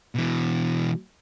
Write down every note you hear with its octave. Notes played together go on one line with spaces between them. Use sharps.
B2 E3